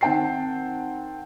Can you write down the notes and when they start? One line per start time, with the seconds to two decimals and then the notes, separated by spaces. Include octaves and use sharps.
0.01 D#3 C4 F#5 G5 A5 C7